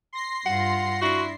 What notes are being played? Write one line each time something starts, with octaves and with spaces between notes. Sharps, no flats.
C6 A#6 C7
G2 F4 F#5
D4 E4 F#4